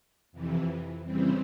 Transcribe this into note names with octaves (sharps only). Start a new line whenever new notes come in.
F2 C3 E3
C#3 E3 G3 C4